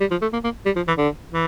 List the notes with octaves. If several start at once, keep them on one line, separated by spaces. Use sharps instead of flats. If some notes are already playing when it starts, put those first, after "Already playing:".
G3
F3
A3
A#3
A#3
G3
F3
E3
D3
E3